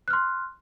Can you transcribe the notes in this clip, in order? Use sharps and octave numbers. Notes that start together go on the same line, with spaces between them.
C6 F6 F#6